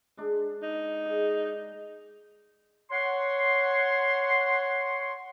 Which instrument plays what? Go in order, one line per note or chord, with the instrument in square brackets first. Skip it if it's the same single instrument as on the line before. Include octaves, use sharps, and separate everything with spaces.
[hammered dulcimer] G#3 D4
[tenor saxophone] D#4
[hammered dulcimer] G#4
[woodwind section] C#5 F#5 C6